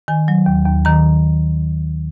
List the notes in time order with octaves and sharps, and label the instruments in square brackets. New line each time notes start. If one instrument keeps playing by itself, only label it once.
[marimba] D#3 G#5
F#3
D#2
D#2
D#3 A#5